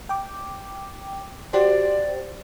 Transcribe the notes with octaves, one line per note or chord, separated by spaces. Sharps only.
G5 D6
F#4 G4 C5 D5